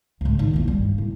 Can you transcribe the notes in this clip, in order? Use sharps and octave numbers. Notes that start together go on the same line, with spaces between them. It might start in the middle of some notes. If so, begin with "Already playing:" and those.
C#2 A2
D#3
A#1 E2
G3 C#4
G2
A2